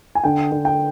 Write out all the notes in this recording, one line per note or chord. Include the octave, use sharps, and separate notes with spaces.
G#5
D3 G5
D3
G5